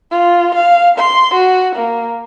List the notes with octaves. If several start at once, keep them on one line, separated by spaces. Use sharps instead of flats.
F4
F5
C6
F#4
A#3